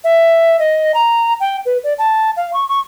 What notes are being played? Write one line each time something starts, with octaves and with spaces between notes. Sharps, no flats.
E5
D#5
A#5
G5
B4
D5
A5
F5
C#6
C#6